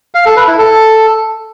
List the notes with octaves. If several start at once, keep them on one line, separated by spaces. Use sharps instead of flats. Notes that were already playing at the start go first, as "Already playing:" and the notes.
F5
A4
B4
E4
A4